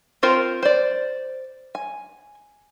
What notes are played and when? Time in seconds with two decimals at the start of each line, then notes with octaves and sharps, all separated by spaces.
0.23 C4 F4 A#4 C5
0.63 C5 D5
1.75 G#5